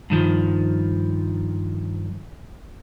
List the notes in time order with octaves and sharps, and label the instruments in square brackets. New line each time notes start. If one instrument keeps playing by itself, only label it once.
[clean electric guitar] G2 D#3 F3